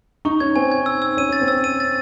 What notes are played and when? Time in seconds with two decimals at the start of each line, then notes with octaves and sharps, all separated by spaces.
0.25 D#4 C#6
0.40 C#4 G#6
0.56 C4 G#5
0.72 G#6
0.86 E6
1.02 E6
1.17 C#4 D#7
1.29 C#4
1.33 A6
1.41 C4
1.48 C#4 E6
1.64 D#7
1.80 A6